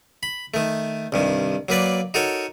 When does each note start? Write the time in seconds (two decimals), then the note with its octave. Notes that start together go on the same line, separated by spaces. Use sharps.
0.23 B5
0.54 D#3 A3
1.12 C2 G2 D#3
1.69 F#3 A#3 B4 D5
2.14 D#4 F#4 A4 A#4 C#5